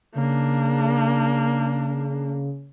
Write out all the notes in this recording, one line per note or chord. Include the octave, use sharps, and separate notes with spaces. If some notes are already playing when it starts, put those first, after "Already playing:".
C#3 A#3 D4